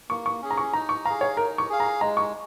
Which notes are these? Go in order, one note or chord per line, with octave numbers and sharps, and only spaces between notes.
A#3 C#6
C#6
C#4 G#4
A#5
C#6
D#4 A#5
C#6
G#4 F5 A#5
C#5
D#4 A#4
C#6
G#4 F5
A#5
G#3 A#5
C#6